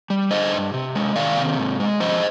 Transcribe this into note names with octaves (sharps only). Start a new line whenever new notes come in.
G3
D3 C5 D#5
G2
C3
G#3
D#3 D5 F5
C3
G#2
G#3
F3 C5 D#5